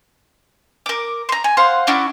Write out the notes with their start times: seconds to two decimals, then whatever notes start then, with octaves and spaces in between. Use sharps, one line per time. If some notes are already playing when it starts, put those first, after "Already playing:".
0.86 A#4 D6
1.29 A#5 C6
1.44 G#5
1.57 C5 F5 F#5 C6
1.87 C#4 D4 E4 F#4